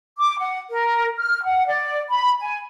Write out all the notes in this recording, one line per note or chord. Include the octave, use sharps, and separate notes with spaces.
D6
F#5
A#4
F6
F#5
D5
B5
G#5